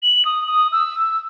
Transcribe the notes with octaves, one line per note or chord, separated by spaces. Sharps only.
F#7
D#6
D#6
E6